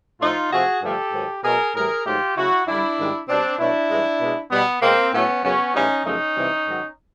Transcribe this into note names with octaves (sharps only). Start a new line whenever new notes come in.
A2 F3 A3 D#4 F4
C3 F3 A3 F#4 G#4
G2 D3 F3 A3 G4 A4
G#2 D#3 F#3
B2 F#3 A3 G#4 A#4
A2 E3 G3 G#4 A#4
G#2 D#3 F#3 A3 F4 G4
C#3 F#3 A3 E4 F#4
F#2 D3 G3 D4 E4
G#2 D#3 G3
B2 G3 C4 D4
B2 F#3 A3 D4 E4
G2 E3 G#3
B2 G#3
B2 G3 B3
B2 G#3 A#3 C4
A2 F#3 A3 B3 C#4
F#2 C#3 F#3 B3 C#4
A2 E3 G3 C#4 D#4
F#2 C#3 F3 A3 C#4 D#4
C3 E3 G3
G#2 D#3 F#3